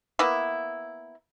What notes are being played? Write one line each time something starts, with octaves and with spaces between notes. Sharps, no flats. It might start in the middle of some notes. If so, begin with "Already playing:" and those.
A#3 B3 E4